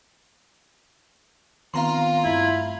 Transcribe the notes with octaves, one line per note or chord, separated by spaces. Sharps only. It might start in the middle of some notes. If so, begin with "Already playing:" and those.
D#3 B3 C4 F4 F5 A#5 C6
G2 A3 E4